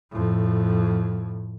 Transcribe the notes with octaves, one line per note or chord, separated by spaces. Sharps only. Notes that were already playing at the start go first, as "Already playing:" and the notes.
F2 A2